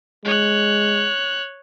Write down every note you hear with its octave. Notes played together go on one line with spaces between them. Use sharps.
G#3 C#5 F#6